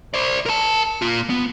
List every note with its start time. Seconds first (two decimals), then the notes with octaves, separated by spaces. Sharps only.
0.14 C5 D5
0.46 A#4 A5
1.02 A#3 F4
1.30 B3